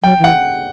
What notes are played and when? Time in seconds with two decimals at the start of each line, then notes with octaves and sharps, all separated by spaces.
0.03 F#3 G5
0.19 E3 F#5